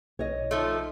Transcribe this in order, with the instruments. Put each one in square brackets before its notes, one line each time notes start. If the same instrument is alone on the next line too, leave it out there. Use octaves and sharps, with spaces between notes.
[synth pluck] B1 [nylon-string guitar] C#5 D#5
[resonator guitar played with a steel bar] F3 A3 [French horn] D#4